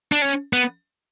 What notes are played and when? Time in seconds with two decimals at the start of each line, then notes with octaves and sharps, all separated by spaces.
0.12 D4
0.22 C#4
0.53 B3